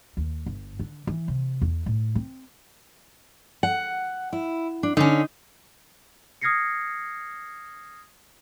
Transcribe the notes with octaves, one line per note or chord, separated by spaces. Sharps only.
D#2
G1
D3
E3
C3
E2
A2
C4
F#5
E4
D4
D3 C#4 D#4
D#6 F6 G#6 A#6 C7 C#7